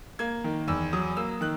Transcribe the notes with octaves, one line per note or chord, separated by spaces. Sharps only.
A#3 G#6
D#3
E2 E6
F#3 D#6
A#3 E6
D#3 F#6